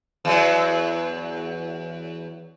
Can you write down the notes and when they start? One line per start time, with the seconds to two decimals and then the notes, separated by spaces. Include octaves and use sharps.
0.25 E2 F#3